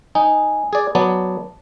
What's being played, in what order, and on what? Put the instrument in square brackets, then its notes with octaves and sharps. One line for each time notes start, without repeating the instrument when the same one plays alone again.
[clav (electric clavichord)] D#4 [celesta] G#5
[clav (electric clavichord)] G#4 D5
[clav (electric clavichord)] F#3 B3 D5 [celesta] A5